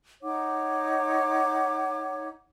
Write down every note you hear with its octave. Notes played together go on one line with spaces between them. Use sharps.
D#4 C#5 F#5 D6